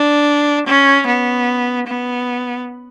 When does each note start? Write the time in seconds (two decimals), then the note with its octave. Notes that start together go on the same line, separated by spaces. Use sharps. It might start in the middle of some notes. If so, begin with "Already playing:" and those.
Already playing: D4
0.67 C#4
1.07 B3
1.87 B3